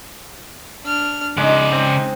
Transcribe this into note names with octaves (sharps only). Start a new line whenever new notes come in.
D4 F6
C#3 G#3 D#4 D5
C4